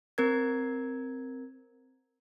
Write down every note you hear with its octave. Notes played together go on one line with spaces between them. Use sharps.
C4 A#4 G#6